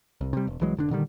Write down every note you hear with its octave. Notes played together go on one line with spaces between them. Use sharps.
C2
C3 G3
E1
C2 E3 F#3 G#3
F1 D3 D4
A#2 D3 D#3 G3